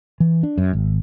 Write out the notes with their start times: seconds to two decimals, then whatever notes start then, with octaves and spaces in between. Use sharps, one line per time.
0.20 E3
0.43 D4
0.58 F#2
0.73 G#1